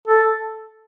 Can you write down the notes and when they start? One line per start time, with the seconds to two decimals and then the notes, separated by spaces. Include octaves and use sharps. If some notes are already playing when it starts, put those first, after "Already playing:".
0.07 A4